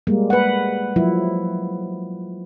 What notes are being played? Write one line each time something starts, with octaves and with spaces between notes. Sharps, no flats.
G3 G#3 A#3
B4 F#5
F3 F#3 E4